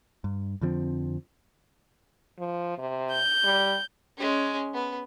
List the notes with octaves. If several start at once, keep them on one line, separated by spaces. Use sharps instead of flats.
G2
F2 D3 F3 C4
F3
C3
G6
G3
G#3 C#4
B3